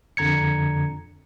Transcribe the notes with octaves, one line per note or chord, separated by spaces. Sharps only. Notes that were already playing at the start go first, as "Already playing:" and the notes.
F2 D3 A#5 G#6 C#7